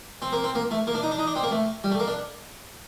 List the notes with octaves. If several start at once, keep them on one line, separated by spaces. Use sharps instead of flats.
C4
A#3
C4
A#3
A3
A#3
D4
D#4
D4
D#4
D4
C4
A#3
A3
G3
A3
A#3
D4